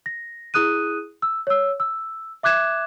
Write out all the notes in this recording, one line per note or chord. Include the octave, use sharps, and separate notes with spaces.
A#6
E4 G#4 D#6 F#6 D#7
E6
C#5 E6
E6
E5 D6 F#6 G#6 E7